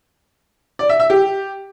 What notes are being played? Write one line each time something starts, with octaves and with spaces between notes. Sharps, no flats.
D5
E5
E5
G4